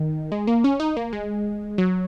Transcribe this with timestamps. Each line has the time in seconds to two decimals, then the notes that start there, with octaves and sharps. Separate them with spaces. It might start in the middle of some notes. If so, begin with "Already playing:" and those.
Already playing: D#3
0.32 G#3
0.47 A#3
0.64 C#4
0.80 D#4
0.97 A#3
1.13 G#3
1.78 F#3